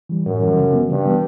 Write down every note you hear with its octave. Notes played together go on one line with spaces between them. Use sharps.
E3 G3
F#2 A2
E3 G3
C#3
E3 G3 B3
G2 C#3
E3 G3 B3